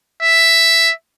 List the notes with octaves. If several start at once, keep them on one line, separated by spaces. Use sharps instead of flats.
E5